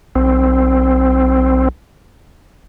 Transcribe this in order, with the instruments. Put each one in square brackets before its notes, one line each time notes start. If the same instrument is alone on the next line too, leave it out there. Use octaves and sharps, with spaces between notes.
[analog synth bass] B1 [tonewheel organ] C4